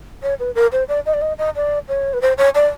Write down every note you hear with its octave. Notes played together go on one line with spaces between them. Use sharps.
C#5
B4
A#4
C5
D5
D#5
D5
D#5
D#5
D5
C#5
B4
C5
C#5
D5